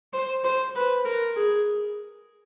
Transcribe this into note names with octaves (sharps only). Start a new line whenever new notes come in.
C5
C5
B4
A#4
G#4